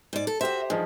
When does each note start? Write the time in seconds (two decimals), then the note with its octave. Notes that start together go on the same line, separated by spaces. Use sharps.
0.13 G#2 D5
0.27 A4
0.41 F#4 G4 C5 E5
0.70 G2 F3 D#4 G#4